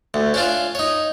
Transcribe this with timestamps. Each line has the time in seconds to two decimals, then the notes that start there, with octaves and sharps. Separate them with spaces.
0.14 D2
0.34 C#4 D4 F4
0.75 D#4 C#5